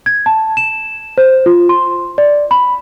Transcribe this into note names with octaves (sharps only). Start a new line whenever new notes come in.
G#6
A5
E7
C5
F4
C6
D5
B5